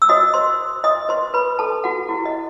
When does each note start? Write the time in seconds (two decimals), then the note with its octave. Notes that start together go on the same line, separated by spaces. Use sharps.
0.02 E6
0.09 F#4 C5 D#5 D#6
0.34 C5 C6
0.84 D#5 D#6
1.09 F#4 B4 C5 C6
1.34 B4 B5
1.59 A4 A5
1.84 F#4 F#5
2.09 E4 F#4 G4 C5 F#5
2.25 D#5